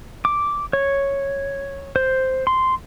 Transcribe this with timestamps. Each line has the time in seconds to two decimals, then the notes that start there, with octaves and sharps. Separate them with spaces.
0.25 D6
0.73 C#5
1.96 C5
2.47 C6